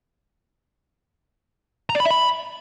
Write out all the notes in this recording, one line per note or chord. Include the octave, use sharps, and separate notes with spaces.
A#5
D5
B5
E5
B5